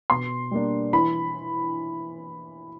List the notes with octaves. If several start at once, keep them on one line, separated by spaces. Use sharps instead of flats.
B2 C6
G3 A#3 D4
E3 B5